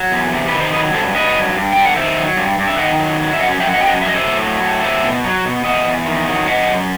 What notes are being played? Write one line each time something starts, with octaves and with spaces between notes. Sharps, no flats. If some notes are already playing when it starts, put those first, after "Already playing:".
Already playing: F#3
E2
C3
B4
D#3
C5
F#3 B4 D#5
G2 A4 C5
F#3 B4 D#5
G2
G2
G2 G5
F#5
D#3 C5 E5
F#3
G2
G2
E5
D#3 D#5 F#5
F#3
F#3
E5
F#2 D#5 F#5
F#3 E5 G5
D#5 F#5
F#2 G5
D#5 F#5
F#3 E5
D#5
C5 E5
A2
F#3
A2
F#3 C5 E5
B2
F#3
B2
E2 D#5 F#5
E2
D#3
F#3
F#2 D#5 F#5
F#2